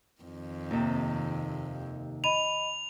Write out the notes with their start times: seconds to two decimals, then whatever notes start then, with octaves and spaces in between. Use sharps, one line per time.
0.22 F2 D#3
0.71 D#2 C3
2.24 D#5 B5 D#7 F7